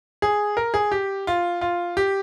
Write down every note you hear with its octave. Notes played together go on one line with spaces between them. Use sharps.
G#4
A#4
G#4
G4
F4
F4
G4